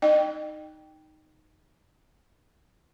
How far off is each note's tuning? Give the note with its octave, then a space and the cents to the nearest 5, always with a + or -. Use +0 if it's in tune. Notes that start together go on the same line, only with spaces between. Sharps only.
D#4 +0 D#5 -40 G5 +0